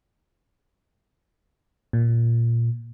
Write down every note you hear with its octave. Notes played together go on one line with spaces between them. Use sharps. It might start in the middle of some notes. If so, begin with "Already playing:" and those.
A#2